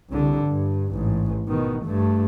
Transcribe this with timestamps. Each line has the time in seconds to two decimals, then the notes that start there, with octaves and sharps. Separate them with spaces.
0.10 C2 D3
0.45 G2
0.92 A1 G#2
1.48 B2 D#3
1.85 G2 A3